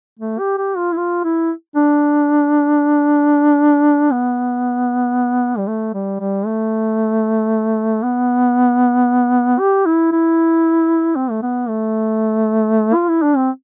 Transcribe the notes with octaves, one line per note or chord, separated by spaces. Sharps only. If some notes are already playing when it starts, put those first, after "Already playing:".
A3
G4
G4
F4
E4
F4
E4
D4
B3
G3
A3
G3
G3
A3
B3
G4
E4
E4
C4
A3
B3
A3
F4
E4
D4
C4